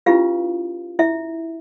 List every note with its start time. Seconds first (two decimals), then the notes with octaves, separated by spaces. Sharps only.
0.06 C#4 E4 F4 G4 B4 F5
0.99 E4 E5